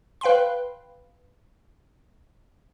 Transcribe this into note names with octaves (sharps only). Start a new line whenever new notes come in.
B4 F5 G5 B5 C6